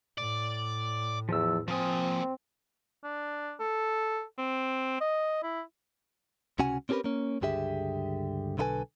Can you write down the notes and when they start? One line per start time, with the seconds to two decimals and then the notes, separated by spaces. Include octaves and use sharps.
0.18 A2 D5
1.29 E2 F3 E6
1.68 F3 A#3 C4 G#5 D#6
3.04 D4
3.59 A4
4.38 C4
5.00 D#5
5.43 E4
6.59 C#2 C3 C#4 F#4 F#5 G#5
6.89 C4 C#4 G4 G#4 A#4 B4
7.04 A#3 C#4
7.41 C#2 G2 D3 G4 G#4 E5
8.58 B1 D3 E4 A4 B4 G#5